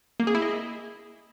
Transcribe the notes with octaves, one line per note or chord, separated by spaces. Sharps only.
A#3
G#4
E4
D#5